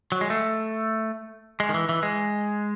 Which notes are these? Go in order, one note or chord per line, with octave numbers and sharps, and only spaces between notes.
F#3
G#3
A3
G#3
D#3
E3
E3
G#3